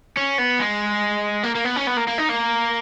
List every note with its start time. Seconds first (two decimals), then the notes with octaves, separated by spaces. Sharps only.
0.17 C#4
0.38 B3
0.59 G#3
1.44 A#3
1.55 A#3
1.65 B3
1.76 C#4
1.87 B3
1.97 A#3
2.07 A#3
2.18 D#4
2.29 A#3